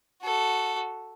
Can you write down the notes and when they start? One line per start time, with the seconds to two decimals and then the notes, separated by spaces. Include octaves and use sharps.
0.23 F#4 A4